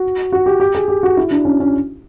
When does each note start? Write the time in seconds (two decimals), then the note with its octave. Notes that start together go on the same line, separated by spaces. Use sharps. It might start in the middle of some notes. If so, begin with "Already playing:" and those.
Already playing: F#4
0.32 F#4
0.46 G4
0.60 G4
0.75 G#4
0.88 G4
1.03 F#4
1.17 E4
1.31 D4
1.45 C#4
1.60 C#4